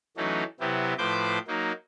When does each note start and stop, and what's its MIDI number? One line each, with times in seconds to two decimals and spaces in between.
0.17 0.44 52
0.17 0.44 54
0.17 0.44 57
0.17 0.44 61
0.17 0.44 63
0.60 0.94 48
0.60 0.94 54
0.60 0.94 59
0.60 0.94 64
0.60 0.94 67
0.98 1.39 45
0.98 1.39 53
0.98 1.39 71
0.98 1.39 72
0.98 1.39 86
0.98 1.39 91
1.47 1.72 54
1.47 1.72 58
1.47 1.72 63